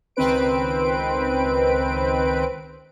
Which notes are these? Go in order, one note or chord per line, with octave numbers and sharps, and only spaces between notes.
C#2 D#3 C4 B4 D7